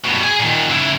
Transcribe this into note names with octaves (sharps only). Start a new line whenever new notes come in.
G2 B2
G#4 G#5
A#2 D#3
C#3 E4